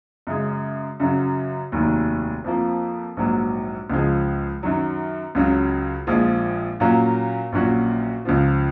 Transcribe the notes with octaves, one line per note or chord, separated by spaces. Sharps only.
F#2 C#3 G#3
F#2 C#3 F#3
F1 D#2 D#3 F#3
F2 F3 A#3
A#1 G#2 F#3
C#2 C#3 F3 G#3
F#2 D#3 F#3
C#2 C#3 F#3
A#1 A#2 F3 G#3
A#2 F#3 A#3 C#4
A#1 A#2 F#3 C#4 F#4
C#2 C#3 F3